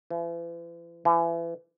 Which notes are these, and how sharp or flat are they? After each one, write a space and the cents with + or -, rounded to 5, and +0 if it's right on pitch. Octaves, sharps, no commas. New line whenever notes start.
E3 +45
E3 +35